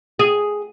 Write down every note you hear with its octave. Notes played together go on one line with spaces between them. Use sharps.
G#4